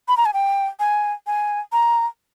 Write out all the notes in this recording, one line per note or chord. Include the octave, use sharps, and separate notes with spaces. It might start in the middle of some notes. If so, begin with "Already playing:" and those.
B5
A#5
G#5
G5
G#5
G#5
A#5